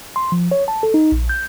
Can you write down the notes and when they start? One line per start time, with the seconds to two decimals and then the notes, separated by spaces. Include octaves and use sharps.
0.16 C6
0.32 F3
0.51 C#5
0.68 A5
0.83 A4
0.94 D#4
1.12 A#1
1.29 G6